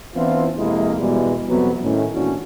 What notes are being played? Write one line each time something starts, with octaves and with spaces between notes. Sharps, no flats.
E3 B3 C4 D4 E4 F4
F2 C3 G#3 A#3 E4
B2 E3 G3 G#3 B3
F2 C3 F#3 G3 B3
A2 D#3 C#4
G#1 A#2 E3 C#4 D4 F#4